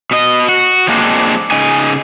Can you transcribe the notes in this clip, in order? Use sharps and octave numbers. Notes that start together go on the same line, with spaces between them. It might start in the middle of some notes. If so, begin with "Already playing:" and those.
B2 D#5
F#4
F3 G#3 A#3 C4 D4
C#3 D#4 G#5